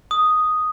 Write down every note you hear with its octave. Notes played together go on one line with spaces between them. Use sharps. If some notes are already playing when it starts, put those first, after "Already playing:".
D#6